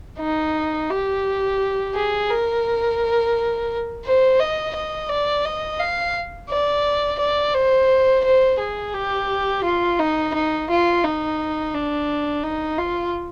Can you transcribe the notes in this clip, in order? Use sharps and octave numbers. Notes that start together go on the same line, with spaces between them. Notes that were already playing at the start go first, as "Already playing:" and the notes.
D#4
G4
G#4
A#4
C5
D#5
D#5
D5
D#5
F5
D5
D5
C5
C5
G#4
G4
F4
D#4
D#4
F4
D#4
D4
D#4
F4